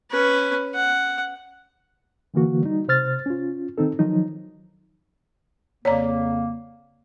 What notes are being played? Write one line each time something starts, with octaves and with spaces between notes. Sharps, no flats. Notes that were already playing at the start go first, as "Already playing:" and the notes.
C#4 B4
F#5
D3 E3 A#3 F#4
G3 D#4
C3 C5 F6 A6
C#4 F4
D#3 C4 D#4 A4
D#3 F3 F#3 D#4
F2 C#3 A#3 C#5 D5 A#5